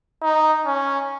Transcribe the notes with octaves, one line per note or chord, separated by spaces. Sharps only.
D#4
C#4